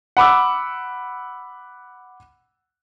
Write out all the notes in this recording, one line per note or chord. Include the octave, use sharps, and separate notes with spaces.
F#5 B5 D6 E6